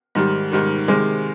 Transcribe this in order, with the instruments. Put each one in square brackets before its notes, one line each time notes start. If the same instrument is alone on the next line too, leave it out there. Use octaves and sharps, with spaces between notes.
[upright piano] G#2 D#3 G3
G#2 D#3 G3
C3 D#3 G#3